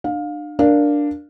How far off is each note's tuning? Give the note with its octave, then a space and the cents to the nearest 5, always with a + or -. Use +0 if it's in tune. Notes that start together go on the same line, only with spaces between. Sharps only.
D4 +35 F5 +20
D4 +0 A#4 +0 F5 +0